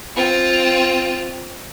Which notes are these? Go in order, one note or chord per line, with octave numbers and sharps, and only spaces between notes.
C4 F4